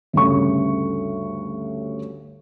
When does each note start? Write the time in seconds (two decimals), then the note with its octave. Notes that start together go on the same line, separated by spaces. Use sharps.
0.13 D2 G2 C#3 C#6